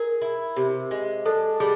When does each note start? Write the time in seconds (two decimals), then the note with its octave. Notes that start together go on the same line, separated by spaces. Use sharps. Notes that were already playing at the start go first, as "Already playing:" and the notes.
Already playing: G#4 A#4
0.22 E4
0.56 C3
0.91 G#3
1.26 D4 A4
1.60 G3 G#4